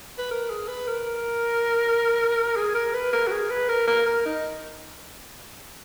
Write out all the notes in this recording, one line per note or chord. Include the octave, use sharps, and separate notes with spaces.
B4
A#4
G#4
B4
A#4
G#4
A#4
B4
A#4
F#4
G#4
B4
A#4
A#4
A#4
D#4